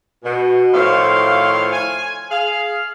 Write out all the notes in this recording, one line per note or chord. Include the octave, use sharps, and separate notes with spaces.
B2
A2 D#3 F3 C#5 F5 C6
G#5
G#4 F5